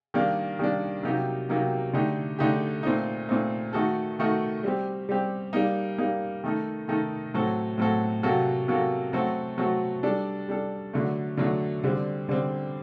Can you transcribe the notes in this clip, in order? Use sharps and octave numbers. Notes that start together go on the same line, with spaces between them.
D#3 G3 A#3 D4
D#3 G3 A#3 D4
C3 F#3 A#3 D#4 G4
C3 F#3 A#3 D#4 G4
D3 A3 D#4 G4
D3 A3 D#4 G4
A#2 A3 C4 D#4
A#2 A3 C4 D#4
D#3 A3 D#4 F#4 A4
D#3 A3 D#4 F#4 A4
G3 C4 G4
G3 C4 G4
G3 A#3 D#4
G3 A#3 D#4
D#3 A3 D#4 A4
D#3 A3 D#4 A4
A2 F#3 C4 F#4 A4
A2 F#3 C4 F#4 A4
C3 F#3 A#3 F#4 A4
C3 F#3 A#3 F#4 A4
F#3 A3 C4 F#4 A4
F#3 A3 C4 F#4 A4
G3 D4 A4
G3 D4 A4
D3 F#3 A3
D3 F#3 A3
D3 G3 C4
D3 G3 C4